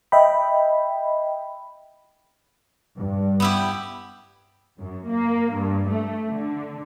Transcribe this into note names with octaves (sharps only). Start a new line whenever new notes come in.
D#5 E5 G5 B5
G2
B3 E4 G4
F#2
A#3
G2
A3
D3